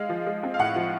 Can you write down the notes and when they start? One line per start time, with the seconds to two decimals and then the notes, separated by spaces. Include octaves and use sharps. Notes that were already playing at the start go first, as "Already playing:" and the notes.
Already playing: G#3 F5
0.09 F3
0.26 G#3
0.43 C4
0.54 F5
0.59 A2 F#5
0.76 F3